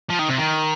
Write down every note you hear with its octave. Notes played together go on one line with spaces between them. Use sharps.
F3
D#3
C3
D#3